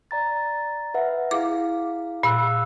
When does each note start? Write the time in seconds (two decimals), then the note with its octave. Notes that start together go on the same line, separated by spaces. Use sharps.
0.11 D5 A#5 A6
0.94 B4 E5 F#5
1.31 E4 G#4 F5 D6
2.23 A#2 F5 E6 F#6